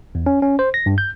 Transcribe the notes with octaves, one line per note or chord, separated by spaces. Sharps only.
E2
C#4
C#4
C5
A#6
G2
G6